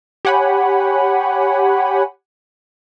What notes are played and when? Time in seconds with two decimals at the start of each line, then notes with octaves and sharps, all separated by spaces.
0.25 G4 C#5 F#5 G#5 B5